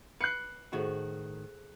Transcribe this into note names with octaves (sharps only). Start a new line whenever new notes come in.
B4 F#6 C7 C#7
A2 D#3 F#4 G#4 A4 C5